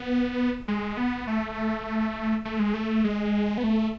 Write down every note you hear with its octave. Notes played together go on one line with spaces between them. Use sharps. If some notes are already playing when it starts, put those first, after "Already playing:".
Already playing: B3
G#3
B3
A3
A3
G#3
A3
G#3
B3
A3